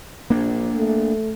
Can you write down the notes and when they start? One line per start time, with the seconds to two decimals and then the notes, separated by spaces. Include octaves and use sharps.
0.30 A#1 A#3 D4
0.75 A3